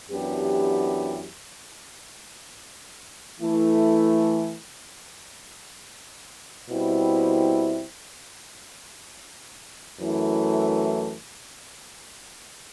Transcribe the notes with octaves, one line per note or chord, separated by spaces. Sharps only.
F#2 E3 B3 D4 G4
E3 A3 E4
B2 G3 C4 E4
F#2 E3 A3 E4